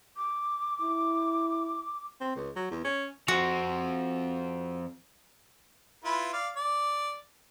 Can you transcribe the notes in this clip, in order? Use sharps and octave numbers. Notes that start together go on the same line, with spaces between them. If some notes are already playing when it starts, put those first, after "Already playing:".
D6
E4
C4
C#2
F#3
E2
C#4
F3 C4 F#4
E4 F4 B4
D5 F5
D5